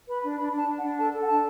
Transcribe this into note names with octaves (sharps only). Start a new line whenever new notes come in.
B4 B5
D4
D4 B5
D4
A5
D4
F#5
D4
A4 A5
A4
F#5
D4 A5